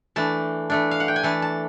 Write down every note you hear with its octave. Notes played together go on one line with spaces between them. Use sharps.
E3 A3 D4 A5
E3 A3 D4
F5
F#5
G5
G#5
E3 A3 D4 A5
A5